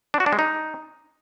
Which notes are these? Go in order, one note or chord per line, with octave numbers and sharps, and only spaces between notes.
D4
F#4
D4
G#3
D#4